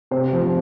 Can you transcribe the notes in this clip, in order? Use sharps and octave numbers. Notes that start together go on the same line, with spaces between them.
C3 C5
F3